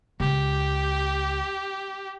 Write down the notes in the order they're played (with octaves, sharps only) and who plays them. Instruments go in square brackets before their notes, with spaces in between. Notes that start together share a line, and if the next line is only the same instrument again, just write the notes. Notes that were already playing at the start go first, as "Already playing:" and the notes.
[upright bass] C#2 [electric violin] G4